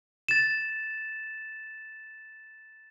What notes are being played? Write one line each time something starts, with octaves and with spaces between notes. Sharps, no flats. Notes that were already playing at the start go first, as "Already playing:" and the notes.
A6 E7